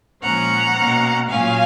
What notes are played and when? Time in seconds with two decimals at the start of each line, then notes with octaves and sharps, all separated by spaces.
0.22 A#2 F3 G#3 C#4 F#5 A#5
0.75 B2 A#3 C#4
1.29 A#2 F#3 C#4 F5 G#5